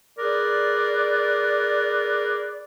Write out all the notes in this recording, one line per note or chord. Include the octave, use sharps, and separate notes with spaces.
G#4 A#4 B4 D5